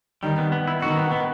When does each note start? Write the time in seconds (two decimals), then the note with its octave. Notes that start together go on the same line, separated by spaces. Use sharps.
0.23 D#3 G3
0.38 B3
0.52 B3
0.67 E4
0.82 D#3 F#4
0.97 B3
1.12 B3